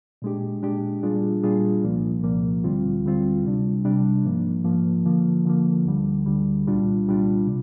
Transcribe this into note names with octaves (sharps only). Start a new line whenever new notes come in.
A#2 G#3 D4 G4
A#2 G#3 D4 G4
A#2 G3 D4 F4 G#4
A#2 G3 D4 F4 G#4
C2 A#2 F3 A#3
C2 A#2 F3 A#3
D2 D3 G3 C4 F4
D2 D3 G3 C4 F4
C3 G3 D4
C3 G3 D4
G#2 F3 A#3
G#2 F3 A#3
D3 F3 A#3
D3 F3 A#3
D2 D3 G3
D2 D3 G3
C2 A#2 G3 D4 F4
C2 A#2 G3 D4 F4
C3